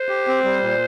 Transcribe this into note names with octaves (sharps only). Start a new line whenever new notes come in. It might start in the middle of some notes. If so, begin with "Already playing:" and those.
Already playing: C5
G4
C4
G3
A#2